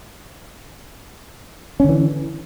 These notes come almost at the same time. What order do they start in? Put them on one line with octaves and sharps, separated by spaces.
C#4 D3 E3